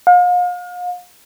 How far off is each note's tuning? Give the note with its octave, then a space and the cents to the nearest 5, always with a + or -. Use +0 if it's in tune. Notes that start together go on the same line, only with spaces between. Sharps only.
F5 +40